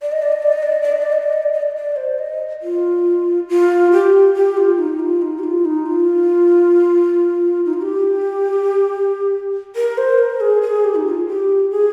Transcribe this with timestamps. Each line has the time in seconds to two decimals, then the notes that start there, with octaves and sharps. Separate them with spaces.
0.02 D5
0.12 D#5
0.22 D5
0.32 D#5
0.42 D5
0.53 D#5
0.63 D5
0.72 D#5
0.82 D5
0.92 D#5
1.02 D5
1.12 D#5
1.23 D5
1.33 D#5
1.42 D5
1.53 D#5
1.62 D5
1.76 D5
1.96 C5
2.18 D#5
2.62 F4
3.49 F4
3.92 G4
4.34 G4
4.57 F4
4.78 D#4
4.99 F4
5.22 D#4
5.39 G4
5.44 F4
5.65 D#4
5.86 F4
7.65 D#4
7.73 F4
7.82 G4
9.76 A#4
9.98 C5
10.19 A#4
10.41 G#4
10.62 G#4
10.84 G4
10.95 D#4
11.06 F4
11.27 G4
11.71 G#4